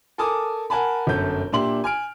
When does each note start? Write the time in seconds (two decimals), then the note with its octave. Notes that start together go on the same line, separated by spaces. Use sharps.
0.18 A4 A#4 G#5 A5 D6 D#6
0.70 A#4 F#5 G#5 A5 B5
1.07 G1 F#2 A4 G6
1.53 A#2 D4 G4 E5 C6 F#7
1.84 G#5 F6 D7